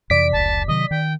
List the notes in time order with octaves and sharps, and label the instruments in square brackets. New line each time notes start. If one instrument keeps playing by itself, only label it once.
[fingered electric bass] F2 C3 E3 [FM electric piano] D5 B6 [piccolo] D7
[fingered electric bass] F1 C#2 [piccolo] A5
[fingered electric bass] C3 D#3 F#3 [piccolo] D#5
[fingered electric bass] D#3 [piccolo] G5